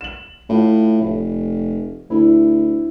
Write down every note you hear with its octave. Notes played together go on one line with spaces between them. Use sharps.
E7 F#7
A2 F4
F1
D2 E4